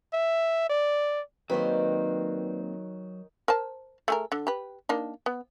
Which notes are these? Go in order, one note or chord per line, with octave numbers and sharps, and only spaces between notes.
E5
D5
D#3 F#3 A#3 C4 B4 C5 D5
A#4 C5 A5
A3 G#4 A#4
D3
G4 B4
A#3 D4 D#4
B3